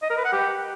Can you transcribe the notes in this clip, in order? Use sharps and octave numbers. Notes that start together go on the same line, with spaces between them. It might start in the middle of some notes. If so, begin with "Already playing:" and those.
D#5
A#4
B4
F#5
G4